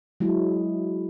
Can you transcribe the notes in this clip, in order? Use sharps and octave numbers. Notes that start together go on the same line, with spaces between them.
F#3 G#3 E4